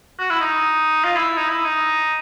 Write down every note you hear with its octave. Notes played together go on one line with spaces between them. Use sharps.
F#4
E4
D#4
F4
E4
D#4
E4
D#4